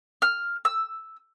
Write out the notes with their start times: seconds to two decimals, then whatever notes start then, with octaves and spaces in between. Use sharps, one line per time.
0.22 F6
0.65 E6